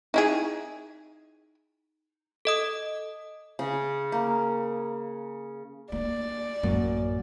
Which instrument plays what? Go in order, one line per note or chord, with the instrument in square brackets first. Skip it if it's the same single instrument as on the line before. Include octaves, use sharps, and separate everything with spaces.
[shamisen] D#4 E4 G#4
[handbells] A4 D#5 D#6
[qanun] C#3
A#3
[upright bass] A#3 D4 [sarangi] D5
[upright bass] A1 A#3 [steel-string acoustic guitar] F#2